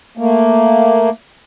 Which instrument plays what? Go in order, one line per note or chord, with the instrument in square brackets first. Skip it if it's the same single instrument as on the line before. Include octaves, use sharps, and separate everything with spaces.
[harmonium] A3 A#3